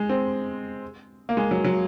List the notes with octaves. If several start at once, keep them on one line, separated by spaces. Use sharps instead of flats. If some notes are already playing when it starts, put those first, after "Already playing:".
Already playing: G#3
C4
A#3
G#3
F#3
F#3